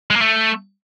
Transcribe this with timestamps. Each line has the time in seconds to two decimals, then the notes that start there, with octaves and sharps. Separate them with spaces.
0.11 G#3
0.16 A#3
0.21 A3